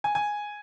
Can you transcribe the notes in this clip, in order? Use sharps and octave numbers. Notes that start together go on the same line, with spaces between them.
G#5
G#5